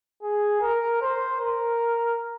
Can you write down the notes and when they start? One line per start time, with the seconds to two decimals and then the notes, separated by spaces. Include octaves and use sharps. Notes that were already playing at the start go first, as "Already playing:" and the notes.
0.23 G#4
0.62 A#4
1.02 C5
1.41 A#4